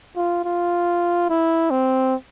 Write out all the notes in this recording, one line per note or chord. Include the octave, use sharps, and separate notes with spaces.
F4
F4
E4
C4